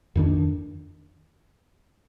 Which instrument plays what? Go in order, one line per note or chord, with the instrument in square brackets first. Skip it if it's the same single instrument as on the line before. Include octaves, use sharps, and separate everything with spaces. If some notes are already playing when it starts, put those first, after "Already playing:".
[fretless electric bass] F2 D#3 A#3 D4